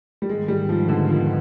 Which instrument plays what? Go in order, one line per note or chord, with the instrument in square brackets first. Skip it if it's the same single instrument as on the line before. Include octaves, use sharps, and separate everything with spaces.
[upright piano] G3
[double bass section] G#2 D#3 B3 [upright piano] G#3
[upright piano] G3
F3
D3
F3